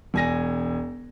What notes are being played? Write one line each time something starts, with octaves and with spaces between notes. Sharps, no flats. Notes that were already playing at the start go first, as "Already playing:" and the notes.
E1 G#5 A#6